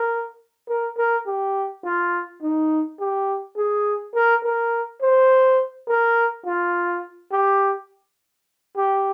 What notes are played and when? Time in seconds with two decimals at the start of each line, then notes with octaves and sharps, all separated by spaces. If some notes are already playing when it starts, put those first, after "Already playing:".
Already playing: A#4
0.69 A#4
0.98 A#4
1.26 G4
1.84 F4
2.42 D#4
3.00 G4
3.57 G#4
4.15 A#4
4.44 A#4
5.02 C5
5.88 A#4
6.46 F4
7.32 G4
8.77 G4